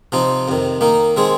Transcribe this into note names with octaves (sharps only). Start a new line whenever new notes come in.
C3 F3 C4 D#4
F2 C3 D#3
D#3 A#3 D#4
D#3 G#3 C4 G#4